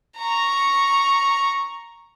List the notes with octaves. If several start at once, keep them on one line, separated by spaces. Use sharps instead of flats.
A#5 C#6